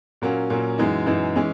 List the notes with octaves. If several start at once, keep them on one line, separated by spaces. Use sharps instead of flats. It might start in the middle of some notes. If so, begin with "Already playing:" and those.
A#2 F#3 A#3 C#4
A#2 F#3 A#3 C#4
F#2 E3 G#3 D#4
F#2 E3 G#3 D#4
E3 G#3 C#4